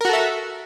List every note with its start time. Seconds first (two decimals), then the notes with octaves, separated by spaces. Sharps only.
0.01 A#4
0.05 F#4
0.09 A4
0.13 E5